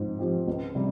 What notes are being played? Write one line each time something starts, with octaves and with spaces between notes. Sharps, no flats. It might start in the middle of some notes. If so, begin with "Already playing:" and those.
Already playing: G#2 F3 C4
F3 C4 G4
C#2
C3 G3